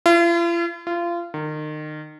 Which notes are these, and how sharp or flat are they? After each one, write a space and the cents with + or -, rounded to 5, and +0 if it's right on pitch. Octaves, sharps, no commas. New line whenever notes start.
F4 -45
F4 -25
D#3 -30